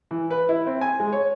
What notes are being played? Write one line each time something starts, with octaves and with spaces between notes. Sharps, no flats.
E3
B4
E4
C4
G#5
G#3
C#5